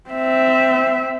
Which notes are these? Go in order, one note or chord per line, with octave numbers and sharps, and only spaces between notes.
C4 E5